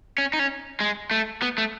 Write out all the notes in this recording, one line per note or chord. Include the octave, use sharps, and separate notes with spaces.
C#4
D#4
C#4
G#3
A3
B3
A3